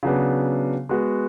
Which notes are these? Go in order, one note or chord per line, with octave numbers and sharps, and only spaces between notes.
C#3 F#3 B3 D4
G#3 B3 F#4